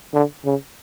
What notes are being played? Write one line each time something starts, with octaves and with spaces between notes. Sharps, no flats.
D3
C#3